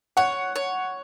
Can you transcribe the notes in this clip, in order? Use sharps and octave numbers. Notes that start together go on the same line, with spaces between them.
C#5 F#5
C#5